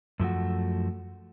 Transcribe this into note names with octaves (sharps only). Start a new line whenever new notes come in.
F#2 F3 A3 F#4